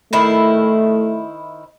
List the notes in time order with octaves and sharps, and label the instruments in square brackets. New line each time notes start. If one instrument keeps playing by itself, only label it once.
[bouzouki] D#3 E4 C5 [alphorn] A3